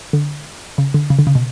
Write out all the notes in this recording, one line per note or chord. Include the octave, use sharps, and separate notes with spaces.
D3
C#3
D3
C#3
D3
C#3
B2